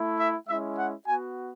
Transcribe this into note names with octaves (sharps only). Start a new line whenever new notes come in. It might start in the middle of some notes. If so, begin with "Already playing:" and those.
Already playing: A3 E4
E5
G#3 C#4 E4 E5
F#5
B3 F#4 G#5